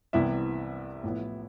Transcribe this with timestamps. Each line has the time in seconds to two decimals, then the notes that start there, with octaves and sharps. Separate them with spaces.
0.13 C2 C3 E3 G3 B3 E4 E5
1.03 A1 A2 F3 B3